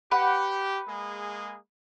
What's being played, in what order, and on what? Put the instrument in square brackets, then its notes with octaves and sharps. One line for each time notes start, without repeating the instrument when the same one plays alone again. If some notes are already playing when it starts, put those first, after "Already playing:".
[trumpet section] G4 [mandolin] B4 F#5
[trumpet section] G#3 A#3 G#4